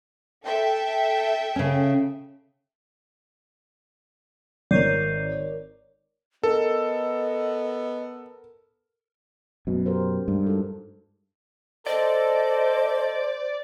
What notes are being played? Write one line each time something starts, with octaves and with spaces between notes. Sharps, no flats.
A4 E5 G5
C#3 C#4
G#1 A#4 C#5 D5 G6 C7 D#7
B3 A4 A#4 D#5
F#2 B2
G4 A#4 C5
G2 G#3
D#4 F#4 A4
A4 C5 D5 D#5